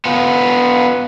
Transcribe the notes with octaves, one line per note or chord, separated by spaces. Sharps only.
B3 F4